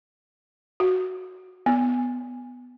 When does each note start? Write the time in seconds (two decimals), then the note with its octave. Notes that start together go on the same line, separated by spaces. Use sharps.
0.80 F#4
1.66 B3